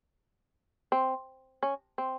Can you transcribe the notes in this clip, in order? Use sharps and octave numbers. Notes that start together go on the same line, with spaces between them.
C4
C#4
C4